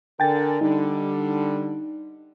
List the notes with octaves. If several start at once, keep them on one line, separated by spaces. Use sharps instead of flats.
D3 A#4 G5 G#5 A6
D3 G3 D#4